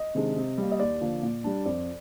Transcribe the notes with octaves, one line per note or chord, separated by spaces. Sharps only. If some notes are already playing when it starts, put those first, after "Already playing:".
Already playing: D#5
C3 D#3 G#3 D4
C3
G3 A#3
D#5
D#2 D5
D3 F3 A#3
A#2
G3 D4
F2 D5